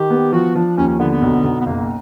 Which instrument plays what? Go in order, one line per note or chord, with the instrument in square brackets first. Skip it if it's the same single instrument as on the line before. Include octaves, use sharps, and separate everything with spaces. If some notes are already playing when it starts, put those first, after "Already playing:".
Already playing: [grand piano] D#3 [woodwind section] G4
[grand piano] B3
[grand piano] F3 [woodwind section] F#4
[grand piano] F3 [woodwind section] D4
[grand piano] D#2 [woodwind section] C#4
[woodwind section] C#4
[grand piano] D3 [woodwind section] B3
[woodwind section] B3
[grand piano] B1
B1
[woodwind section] B3
[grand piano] F#1 [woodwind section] A#3